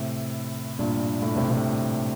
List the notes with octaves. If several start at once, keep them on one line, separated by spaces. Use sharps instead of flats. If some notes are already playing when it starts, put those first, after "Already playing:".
Already playing: A2 C3
G2 A#2
A2
A2 C3
A2 C3